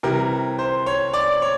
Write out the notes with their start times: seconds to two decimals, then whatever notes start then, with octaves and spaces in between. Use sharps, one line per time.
0.03 C3 E3 G3 A#4
0.59 C5
0.86 C#5
1.14 D5
1.42 C#5